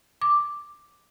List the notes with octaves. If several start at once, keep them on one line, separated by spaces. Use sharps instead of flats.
D6